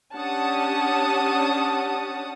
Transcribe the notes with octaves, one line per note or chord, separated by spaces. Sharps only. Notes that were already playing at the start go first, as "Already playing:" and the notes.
C#4 D4 G4 F#5 A5 D#6